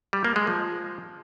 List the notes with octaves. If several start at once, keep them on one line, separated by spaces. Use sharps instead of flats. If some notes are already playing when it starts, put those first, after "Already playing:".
G3
A#3
G#3
F3